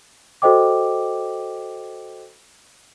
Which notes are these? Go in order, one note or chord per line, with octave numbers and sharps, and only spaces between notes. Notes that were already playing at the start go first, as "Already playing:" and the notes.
F#4 A4 C5 D#5 G5 D6